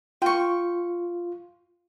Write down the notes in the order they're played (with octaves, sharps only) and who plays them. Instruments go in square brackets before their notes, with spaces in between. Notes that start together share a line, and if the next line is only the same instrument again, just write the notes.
[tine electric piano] F4 [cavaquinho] G5 C#6